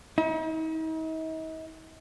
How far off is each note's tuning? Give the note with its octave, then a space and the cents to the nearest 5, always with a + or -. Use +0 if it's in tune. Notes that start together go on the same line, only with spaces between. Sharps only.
D#4 +45